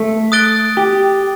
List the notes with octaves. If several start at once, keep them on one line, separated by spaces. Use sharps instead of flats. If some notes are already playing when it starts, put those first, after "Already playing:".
Already playing: A3
D#6 F#6 A6 D7 G7
G4